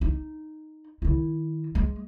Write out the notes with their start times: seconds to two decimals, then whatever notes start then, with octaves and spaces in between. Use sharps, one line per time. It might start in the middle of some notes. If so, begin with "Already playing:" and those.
0.01 D#4
1.02 D#3 E4
1.75 G#3